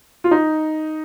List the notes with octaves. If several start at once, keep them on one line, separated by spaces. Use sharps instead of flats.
F4
D#4